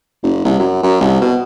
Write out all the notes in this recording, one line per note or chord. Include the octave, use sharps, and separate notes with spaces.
F#1
C2
F#2
F#2
C2
B2